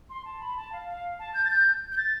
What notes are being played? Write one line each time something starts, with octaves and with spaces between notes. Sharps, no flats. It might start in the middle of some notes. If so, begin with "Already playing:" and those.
C6
A5
B5
A5
F5
F5
A5
G6
A6
G6
G6
A6